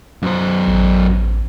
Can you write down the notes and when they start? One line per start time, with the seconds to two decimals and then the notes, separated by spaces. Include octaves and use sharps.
0.23 F#2 C5
0.68 A1